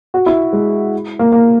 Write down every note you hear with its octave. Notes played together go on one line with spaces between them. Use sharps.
F#4
E4
G#3
A#3
A#3